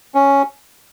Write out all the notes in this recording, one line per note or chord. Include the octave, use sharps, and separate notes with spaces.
C#4